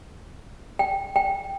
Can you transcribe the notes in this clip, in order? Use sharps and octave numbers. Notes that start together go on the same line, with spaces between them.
G5
G5